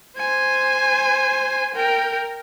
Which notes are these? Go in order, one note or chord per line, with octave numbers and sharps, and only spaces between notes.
C5 G#5
A#4 G5